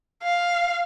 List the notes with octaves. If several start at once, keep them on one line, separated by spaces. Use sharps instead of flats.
F5